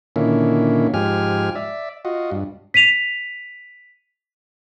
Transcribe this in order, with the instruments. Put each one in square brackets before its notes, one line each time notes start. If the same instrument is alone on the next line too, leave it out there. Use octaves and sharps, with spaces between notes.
[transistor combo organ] A#2 D3 D#3 A#3 C#4 E4
G#2 F3 G4 G#5 F6
D5 E5
F4 F#4 D#5
G2
[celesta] B6 D#7 F7